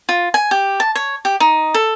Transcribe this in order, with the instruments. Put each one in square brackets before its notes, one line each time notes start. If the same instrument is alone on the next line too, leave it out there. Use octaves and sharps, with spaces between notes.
[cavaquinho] F4
G#5
G4
A5
C#5
G4
D#4
A4